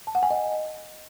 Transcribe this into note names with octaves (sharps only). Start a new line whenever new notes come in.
A5
F#5
G#5
D#5